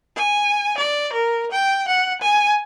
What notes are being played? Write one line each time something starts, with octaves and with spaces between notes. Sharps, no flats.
G#5
D5
A#4
G5
F#5
G#5